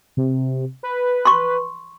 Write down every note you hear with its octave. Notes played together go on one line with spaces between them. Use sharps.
C3
B4
C6 C#6